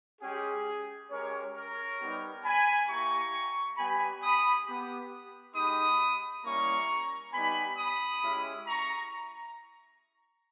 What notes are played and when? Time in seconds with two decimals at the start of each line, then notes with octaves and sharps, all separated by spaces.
0.21 G#3 C#4 G4 G#4
1.10 G#3 C#4 G4 A#4 C#5
1.55 A#4 C#5
2.00 G3 B3 D#4 G4
2.44 G#5 B5
2.88 A#3 E4 G4 A#5 C#6
3.77 G3 B3 G4 G#5 B5
4.22 B5 D#6
4.66 B3 G4
5.55 G#3 D#4 G4 B5 D#6
6.44 G3 A#3 C#4 E4 A#5 C#6
7.33 G3 B3 D#4 G4 G#5 B5
7.77 B5 D#6
8.22 G#3 C#4 E4 G4
8.67 A#5 C#6